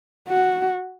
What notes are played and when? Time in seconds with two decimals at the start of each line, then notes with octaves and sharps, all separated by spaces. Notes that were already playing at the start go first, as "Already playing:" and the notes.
0.28 F#4